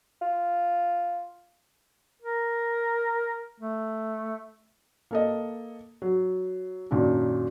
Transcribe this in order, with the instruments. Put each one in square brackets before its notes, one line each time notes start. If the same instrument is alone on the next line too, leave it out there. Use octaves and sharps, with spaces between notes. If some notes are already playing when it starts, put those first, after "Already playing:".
[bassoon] F4
[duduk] A#4
A3
[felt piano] A#3 A4 D#5
F#3
F#2 A#2 D#3 F#3 D4